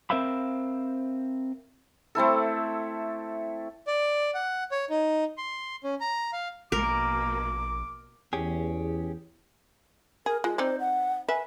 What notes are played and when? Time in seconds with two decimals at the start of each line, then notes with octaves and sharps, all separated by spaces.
0.10 C4 A#4 C5 E5 F5 B5
2.15 A3 C4 E4 A4
3.87 D5
4.34 F#5
4.72 C#5
4.90 D#4
5.38 C6
5.84 C#4
6.01 A#5
6.33 F5
6.72 A#1 B2 A#3 A#4 D6
8.33 E2 C#4 G4 G#4
10.26 G#4 A#4
10.44 G#3 F4
10.58 C4 D#4 C5 D5
10.80 F#5
11.28 B4 E5 G#5